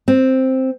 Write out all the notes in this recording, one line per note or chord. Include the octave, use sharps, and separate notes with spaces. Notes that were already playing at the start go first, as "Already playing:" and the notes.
C4